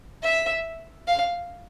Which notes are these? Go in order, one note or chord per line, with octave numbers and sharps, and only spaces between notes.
E5
F5